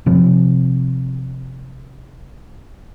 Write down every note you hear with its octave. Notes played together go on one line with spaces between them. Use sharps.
C3 F3 C4